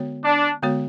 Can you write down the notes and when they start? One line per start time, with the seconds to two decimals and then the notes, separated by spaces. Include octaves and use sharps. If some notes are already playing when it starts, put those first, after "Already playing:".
Already playing: D3 G#3 B3 F#4 C#5
0.24 D4
0.62 D3 G#3 B3 F#4 C#5